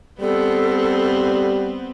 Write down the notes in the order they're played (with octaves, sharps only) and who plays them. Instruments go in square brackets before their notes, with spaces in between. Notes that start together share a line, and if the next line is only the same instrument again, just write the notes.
[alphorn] G3 [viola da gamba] B3 C4 [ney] A4